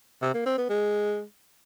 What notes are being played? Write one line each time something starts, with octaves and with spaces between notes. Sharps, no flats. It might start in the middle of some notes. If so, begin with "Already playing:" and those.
C3
A#3
C4
B3
G#3